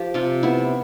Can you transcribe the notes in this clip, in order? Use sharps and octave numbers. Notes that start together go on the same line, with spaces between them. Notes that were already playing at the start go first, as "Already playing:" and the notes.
Already playing: F3 G4
C3 F4
B3 E4